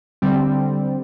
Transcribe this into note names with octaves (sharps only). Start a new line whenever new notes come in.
D3 G3 C4